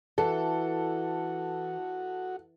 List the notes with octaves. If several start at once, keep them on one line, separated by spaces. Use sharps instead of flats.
E3 F#4 A4